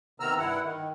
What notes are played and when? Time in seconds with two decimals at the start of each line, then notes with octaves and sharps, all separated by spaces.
0.20 C3 D#3 B3 A#5 E6 F6
0.38 G2 E4 F#5
0.63 D#3